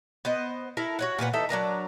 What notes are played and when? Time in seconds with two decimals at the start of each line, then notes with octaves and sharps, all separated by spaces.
0.25 B3 C5 D#5
0.77 E4 A4 A#4
0.99 F#4 C#5 F#5
1.19 A#2 F4 B4 F#5
1.33 E3 D#4 A4 E5
1.49 F#3 D4 A#4 A#5